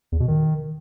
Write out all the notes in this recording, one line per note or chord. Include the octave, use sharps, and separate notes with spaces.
E2
B2
D#3